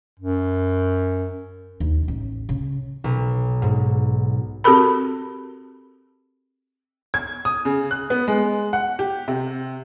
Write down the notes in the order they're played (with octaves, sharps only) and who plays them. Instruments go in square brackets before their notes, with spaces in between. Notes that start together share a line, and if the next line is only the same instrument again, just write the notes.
[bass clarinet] F#2
[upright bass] D#2
A1
C#3
[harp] B1
G#2
[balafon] C4 F#4 G4 A4 A#4 B5
[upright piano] G#6
D#6
C#3
F#6
B3
G#3
F#5
G4
C3